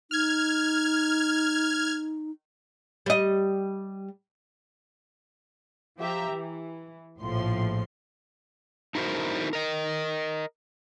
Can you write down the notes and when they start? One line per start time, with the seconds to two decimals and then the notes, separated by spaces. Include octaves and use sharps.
0.11 D#4 F6 G#6
3.06 G3 D#5
5.97 F3 G4 E5 A#5
6.29 E3
7.19 A#1 A2 F3 C6
8.95 D#4 E4 F#4 A#4 C5
9.53 A#4 D#5